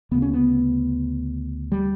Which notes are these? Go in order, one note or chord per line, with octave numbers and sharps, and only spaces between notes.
D2 C#3 B3
C#4
B3
G3